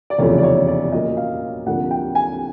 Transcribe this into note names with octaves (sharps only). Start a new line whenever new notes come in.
D5
F1 E2 C#3 F3 A3 C#5
D5
C#5
D5
A#2 F#3 A#3 C#4 D#5
F5
D2 C3 F3 A#3 D4 F#5
G5
G#5